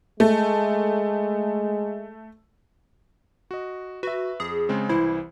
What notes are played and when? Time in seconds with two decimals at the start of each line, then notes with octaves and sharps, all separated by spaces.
0.20 G#3 A3
3.51 F#4 D#5
4.03 F#4 B4 E5
4.40 F2 G#4
4.69 C#3 G#3 C4
4.89 C2 E3 E4 C5